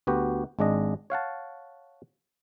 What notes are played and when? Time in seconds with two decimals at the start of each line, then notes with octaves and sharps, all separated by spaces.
0.07 D2 B3 F#4 G4
0.59 G#1 G#3 D4 D#5
1.10 C#5 F5 F#5 A5